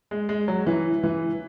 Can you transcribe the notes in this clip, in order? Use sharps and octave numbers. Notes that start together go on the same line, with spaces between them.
G#3
G#3
F#3
E3
E3